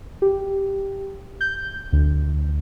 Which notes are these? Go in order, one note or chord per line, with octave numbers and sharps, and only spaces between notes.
G4
G6
D2